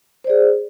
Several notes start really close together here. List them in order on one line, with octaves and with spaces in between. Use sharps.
C5 D5 G#4